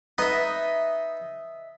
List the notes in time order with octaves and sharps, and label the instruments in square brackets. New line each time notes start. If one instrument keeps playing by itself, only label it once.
[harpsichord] B3 D#4 B4 [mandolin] D#5 E5